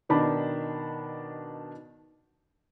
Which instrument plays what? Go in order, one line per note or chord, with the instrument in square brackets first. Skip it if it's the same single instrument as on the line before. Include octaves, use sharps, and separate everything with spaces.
[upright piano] B2 D#3 D4 B5